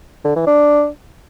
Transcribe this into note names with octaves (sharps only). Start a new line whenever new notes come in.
D3
E3
D4